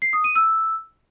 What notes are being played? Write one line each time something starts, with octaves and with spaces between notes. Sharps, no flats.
C7
D#6
D#7
E6